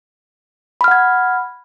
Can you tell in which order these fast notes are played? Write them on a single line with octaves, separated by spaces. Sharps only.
B5 F6 F#5 G#6